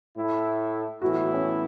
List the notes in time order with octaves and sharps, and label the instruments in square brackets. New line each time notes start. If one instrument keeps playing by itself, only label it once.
[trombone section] A2 A3 E4
[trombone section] A2 E3 B3 E4 [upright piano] F#4
[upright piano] F#4
C#4